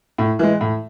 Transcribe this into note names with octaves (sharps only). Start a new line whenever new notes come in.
A2
E3 G#3
A2